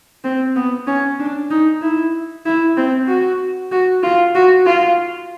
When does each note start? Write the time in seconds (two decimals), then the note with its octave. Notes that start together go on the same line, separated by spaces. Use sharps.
0.24 C4
0.56 B3
0.87 C#4
1.20 D4
1.50 D#4
1.82 E4
2.46 E4
2.77 C4
3.08 F#4
3.72 F#4
4.03 F4
4.35 F#4
4.66 F4